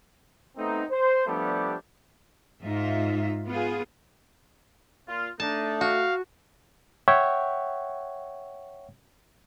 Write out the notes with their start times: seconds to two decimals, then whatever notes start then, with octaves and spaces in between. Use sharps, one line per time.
0.57 A3 B3 C4 D#4
0.91 C5
1.27 F3 G3 A3 B3 D4 G4
2.63 G#2 D#4 F4 E5
3.46 B3 F4 G#4
5.08 A#2 F4
5.40 A3 D4 D#4 A5
5.81 F#4 F5
7.08 C#5 E5 F#5 G5 C#6